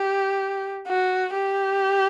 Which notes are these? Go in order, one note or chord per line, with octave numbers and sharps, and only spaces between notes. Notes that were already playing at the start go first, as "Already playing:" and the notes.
Already playing: G4
F#4
G4